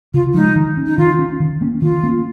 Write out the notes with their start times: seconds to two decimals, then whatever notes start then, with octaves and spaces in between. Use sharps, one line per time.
0.14 C#3 F4
0.34 F3 G#3 D#4
0.56 D#3
0.77 C#4
0.86 D#4
0.98 D#3 F4
1.19 C#4
1.40 D#3
1.61 A#3 C#4
1.82 D#3 F4
2.03 A#3 C#4